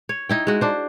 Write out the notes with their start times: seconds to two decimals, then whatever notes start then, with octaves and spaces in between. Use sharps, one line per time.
0.09 C#5
0.29 D#4 E4 G5
0.47 G#3 F#4
0.61 D4 C5